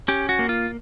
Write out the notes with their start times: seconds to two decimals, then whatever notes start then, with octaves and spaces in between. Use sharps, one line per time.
0.08 C#4 G4
0.29 F#4
0.39 A#3
0.49 F4